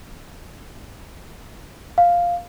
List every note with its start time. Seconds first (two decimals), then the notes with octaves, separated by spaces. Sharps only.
1.98 F5